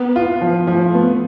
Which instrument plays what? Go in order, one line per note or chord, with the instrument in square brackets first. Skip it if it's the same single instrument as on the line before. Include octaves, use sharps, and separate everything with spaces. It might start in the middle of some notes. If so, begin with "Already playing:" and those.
Already playing: [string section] B3
[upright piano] F4
F3
[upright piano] F3 [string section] A3
[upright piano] B3